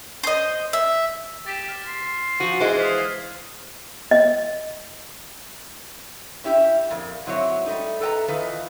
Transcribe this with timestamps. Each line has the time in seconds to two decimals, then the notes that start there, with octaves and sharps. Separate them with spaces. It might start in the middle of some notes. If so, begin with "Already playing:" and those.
0.23 C5 D#5
0.73 E5
1.46 G4 A6 B6 E7
1.69 F6
1.87 C6
2.40 F3 F#4 D#7
2.60 E3 G#3 C5
2.80 F5 D#6 B6
4.11 D#5
6.44 C#4 E4 G4
6.90 F2 A#2 A#3
7.26 G#2 F#3 C4 E4 C#5
7.66 G3 A3 D#4
8.01 A4 B4 D#5 G5 A5 A#5
8.28 D#3 E3 D#4 F4 B4